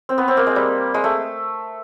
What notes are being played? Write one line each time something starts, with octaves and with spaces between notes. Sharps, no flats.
C4
B3
C4
A#3
G#3
G3
G#3
A3